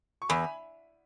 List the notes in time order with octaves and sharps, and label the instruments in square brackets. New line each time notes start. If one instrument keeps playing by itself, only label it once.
[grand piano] C#6
[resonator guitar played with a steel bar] E2 [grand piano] G#5 B5